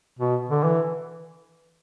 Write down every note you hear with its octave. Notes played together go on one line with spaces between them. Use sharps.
B2
D3
E3